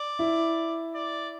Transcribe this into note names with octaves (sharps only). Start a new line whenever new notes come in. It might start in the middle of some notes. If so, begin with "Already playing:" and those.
Already playing: D5
E4
D5